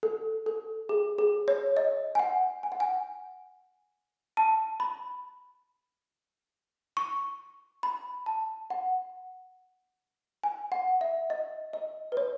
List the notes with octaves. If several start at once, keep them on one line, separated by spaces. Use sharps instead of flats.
A4
A4
G#4
G#4
C#5
D#5
G#5
F#5
G#5
F#5
G#5
A5
B5
C#6
B5
A5
F#5
G#5
F#5
E5
D#5
D#5
B4
C#5